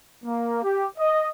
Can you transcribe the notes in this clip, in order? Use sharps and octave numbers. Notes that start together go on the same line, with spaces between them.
A#3
G4
D#5